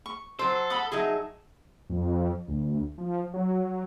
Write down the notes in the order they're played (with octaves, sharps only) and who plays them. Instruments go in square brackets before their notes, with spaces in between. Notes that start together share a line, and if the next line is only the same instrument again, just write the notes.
[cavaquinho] C#6
[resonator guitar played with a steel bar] F#3 C5 [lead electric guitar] A4
[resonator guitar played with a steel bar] F#5 [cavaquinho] B5 C6 D#6
[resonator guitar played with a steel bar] F#3 G#4 [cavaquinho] D#4 E5 A5
[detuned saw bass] F2
D2
F3
F#3